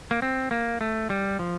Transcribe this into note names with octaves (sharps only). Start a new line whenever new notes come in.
A#3
C4
A#3
A3
G3
F3